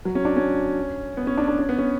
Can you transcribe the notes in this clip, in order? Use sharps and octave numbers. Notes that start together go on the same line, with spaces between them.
F#3
C#4
D4
C#4
B3
C#4
D4
D4
C#4
B3
C#4